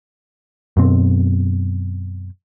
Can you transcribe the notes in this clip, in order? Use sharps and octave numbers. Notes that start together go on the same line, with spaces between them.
F#2 B2 C4